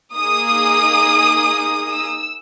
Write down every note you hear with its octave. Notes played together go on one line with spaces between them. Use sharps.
A#3 D#4 G#4 D#6
E6